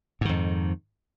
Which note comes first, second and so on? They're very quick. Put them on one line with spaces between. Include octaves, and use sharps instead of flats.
G#2 D#3 F2